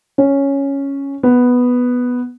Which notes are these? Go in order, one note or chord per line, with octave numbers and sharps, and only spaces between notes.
C#4
B3